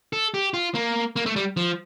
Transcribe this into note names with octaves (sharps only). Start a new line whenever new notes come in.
A4
G4
F4
A#3
A#3
A3
G3
F3